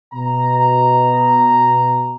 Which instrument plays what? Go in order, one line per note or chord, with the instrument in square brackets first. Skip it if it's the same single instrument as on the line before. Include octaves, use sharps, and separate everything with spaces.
[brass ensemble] B2 A#5